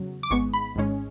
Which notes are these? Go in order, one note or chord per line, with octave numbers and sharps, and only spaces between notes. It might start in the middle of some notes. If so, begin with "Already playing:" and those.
Already playing: E2 C#3 F#3
D6
G#1 G#2 G#3 B3 C#6
B5
G#1 G#2 G#3 C#4